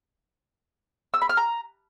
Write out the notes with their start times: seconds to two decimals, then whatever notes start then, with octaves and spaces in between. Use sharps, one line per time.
1.14 E6
1.22 B5
1.29 F6
1.37 A#5